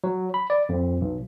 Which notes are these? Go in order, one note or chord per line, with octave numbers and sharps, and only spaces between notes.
F#3
B5
D5
F2
B1